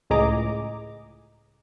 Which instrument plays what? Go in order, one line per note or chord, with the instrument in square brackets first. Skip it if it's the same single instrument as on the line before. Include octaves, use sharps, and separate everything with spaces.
[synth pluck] C#2 A2 G#4 D#5 A#5 D6